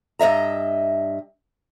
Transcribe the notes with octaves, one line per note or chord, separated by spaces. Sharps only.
G2 D#5 E5 A#5